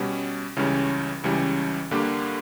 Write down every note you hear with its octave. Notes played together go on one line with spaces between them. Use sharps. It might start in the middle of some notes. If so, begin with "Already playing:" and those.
Already playing: B2 G3 C#4
C#2 C#3 E3 G3 C#4
C#2 C#3 E3 G3 C#4
G2 D3 A#3 D4 G4